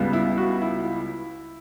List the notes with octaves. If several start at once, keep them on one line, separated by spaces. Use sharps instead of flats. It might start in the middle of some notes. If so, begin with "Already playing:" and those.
Already playing: C#2 C#3 G3 B3
E4
F#4
E4